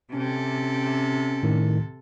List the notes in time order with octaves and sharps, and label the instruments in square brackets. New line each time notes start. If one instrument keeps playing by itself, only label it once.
[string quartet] C3 A4 [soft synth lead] C#4
[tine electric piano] A2 D#3